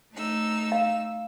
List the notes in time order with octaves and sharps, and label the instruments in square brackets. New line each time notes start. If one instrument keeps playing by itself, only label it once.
[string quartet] A3 D#4 E6
[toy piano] F5